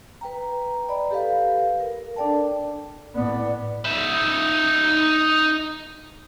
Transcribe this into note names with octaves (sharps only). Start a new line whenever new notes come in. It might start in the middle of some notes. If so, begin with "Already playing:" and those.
B4 G5 A#5
D5 D#5 B5
G4 A4 B4 F5
A#4
D4 A4 D5 G5 A5
A2 B3 D5
D#4 E5